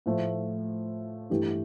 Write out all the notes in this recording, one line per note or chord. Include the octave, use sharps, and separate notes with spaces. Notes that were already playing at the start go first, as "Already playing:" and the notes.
A2 F3 A3
G2 E3 A3 E4 G4